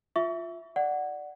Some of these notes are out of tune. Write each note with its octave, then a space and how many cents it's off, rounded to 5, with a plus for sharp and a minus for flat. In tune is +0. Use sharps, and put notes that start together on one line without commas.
F4 +0 E5 +5 C#6 +35
D5 +5 F#5 +0